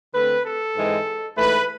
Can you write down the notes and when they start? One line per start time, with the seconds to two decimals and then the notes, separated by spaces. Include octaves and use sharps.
0.14 D3 A3 C4 B4
0.44 A4
0.75 G#2 E3 G#3 C4
1.37 G#2 E3 A3 B4